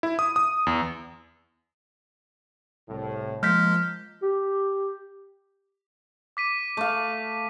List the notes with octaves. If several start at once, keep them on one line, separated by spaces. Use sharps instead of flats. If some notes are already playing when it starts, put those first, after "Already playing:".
E4
D#6
D#6
E2
C2 A2
F3 G#3 A#3 F6 G6 B6
G4
D6 B6 D#7
A3 F5